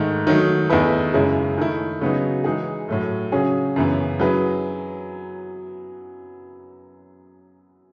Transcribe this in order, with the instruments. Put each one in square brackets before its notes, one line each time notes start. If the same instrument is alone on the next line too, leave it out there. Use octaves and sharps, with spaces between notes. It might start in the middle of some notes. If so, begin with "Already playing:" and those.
Already playing: [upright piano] G#2 D#3 A3
D#3 F#3 A3 D#4
E2 D#3 A3 E4 B4
F#2 C#3 G#3 C#4 E4
D#3 A3 E4
C#3 F#3 B3 D#4 F#4
E3 G#3 D#4 G#4
A2 F#3 A3
C#3 F#3 C#4 G#4
F#2 C#3 E3 B3
F#3 C#4 E4 G#4 B4